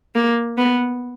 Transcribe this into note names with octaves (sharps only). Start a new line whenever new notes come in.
A#3
B3